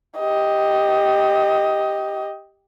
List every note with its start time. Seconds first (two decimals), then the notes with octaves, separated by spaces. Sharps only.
0.18 G4 D#5